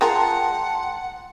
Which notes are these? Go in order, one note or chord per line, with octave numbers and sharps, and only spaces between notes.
G#3 F4 A#4 F#5 G5 A5 C6